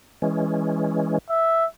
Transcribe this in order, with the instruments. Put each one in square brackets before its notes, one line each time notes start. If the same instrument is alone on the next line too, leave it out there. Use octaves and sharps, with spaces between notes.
[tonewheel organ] E3 G#3 C#4
[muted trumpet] E5